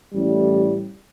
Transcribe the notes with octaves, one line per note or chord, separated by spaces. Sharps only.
A1 A2 G3